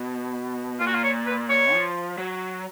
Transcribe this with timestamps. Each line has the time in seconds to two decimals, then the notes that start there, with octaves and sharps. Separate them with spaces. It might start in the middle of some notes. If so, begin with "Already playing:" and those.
Already playing: B2
0.79 A#2 F4
0.87 F#4
0.95 F4
1.04 C#5
1.26 B4
1.49 C#5
1.73 F3
2.18 F#3